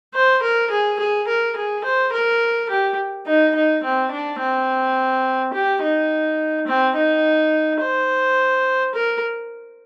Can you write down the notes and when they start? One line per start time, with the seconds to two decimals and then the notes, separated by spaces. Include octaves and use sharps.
0.14 C5
0.43 A#4
0.70 G#4
0.99 G#4
1.27 A#4
1.56 G#4
1.84 C5
2.12 A#4
2.70 G4
3.26 D#4
3.55 D#4
3.83 C4
4.11 D4
4.40 C4
5.53 G4
5.82 D#4
6.67 C4
6.96 D#4
7.81 C5
8.95 A#4